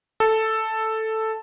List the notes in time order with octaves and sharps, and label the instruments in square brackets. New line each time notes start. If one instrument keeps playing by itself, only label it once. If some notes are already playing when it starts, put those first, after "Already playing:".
[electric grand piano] A4